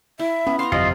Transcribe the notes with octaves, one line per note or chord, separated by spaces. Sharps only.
E4 E5
B3 C#4
F5 A#5 C6
G1 F2 C3 F#3 F4 D#5